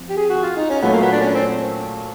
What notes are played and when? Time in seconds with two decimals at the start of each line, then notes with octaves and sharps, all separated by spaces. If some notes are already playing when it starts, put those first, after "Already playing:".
Already playing: F3 C4
0.09 G4
0.17 G#4
0.30 F#4
0.43 F4
0.57 D#4
0.70 C#4
0.82 A#2 F#3 A3 B3
0.93 A#3
1.01 B3
1.12 D4
1.21 C#4
1.34 C4